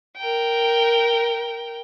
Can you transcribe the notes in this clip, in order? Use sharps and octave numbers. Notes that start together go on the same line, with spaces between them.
A#4 G5